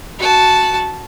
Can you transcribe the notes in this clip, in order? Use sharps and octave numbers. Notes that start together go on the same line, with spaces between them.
F#4 A5